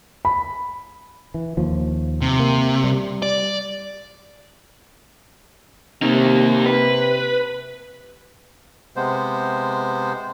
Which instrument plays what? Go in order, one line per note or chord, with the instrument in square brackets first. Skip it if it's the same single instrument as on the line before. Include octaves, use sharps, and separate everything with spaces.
[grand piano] B5
[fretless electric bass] E3
D#2 F3
[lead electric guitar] C3
[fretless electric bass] A#3
G3
[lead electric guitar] D5
[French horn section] C3 [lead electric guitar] A#3 D#4
[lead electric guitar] B4
[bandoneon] C3 G#3 B3 C5